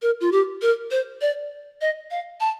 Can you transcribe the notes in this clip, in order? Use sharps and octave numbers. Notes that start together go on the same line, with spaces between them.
A#4
F4
G4
A#4
C5
D5
D#5
F5
A5